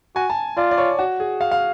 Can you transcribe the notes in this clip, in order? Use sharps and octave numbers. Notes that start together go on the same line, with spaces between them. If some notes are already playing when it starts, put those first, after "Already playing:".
F#4 G#5
A5
F4 D5
D5
C#5
F#4
G#4
F5
F5